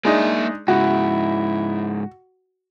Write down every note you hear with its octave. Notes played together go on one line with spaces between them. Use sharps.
G#3 A#3 D4 D#4 E5
G#2 C#3 E4 F#4